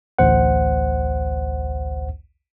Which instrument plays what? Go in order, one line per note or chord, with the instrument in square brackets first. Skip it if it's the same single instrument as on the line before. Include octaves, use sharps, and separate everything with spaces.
[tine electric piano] A1 D2 C5 F#5